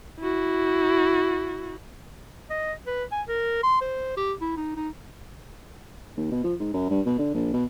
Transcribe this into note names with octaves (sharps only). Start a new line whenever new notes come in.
E4 F#4
D#5
B4
G#5
A#4
C6
C5
G4
E4
D#4
D#4
D#2
B2
F3
G#2
F#2
G2
B2
D3
A#1
B2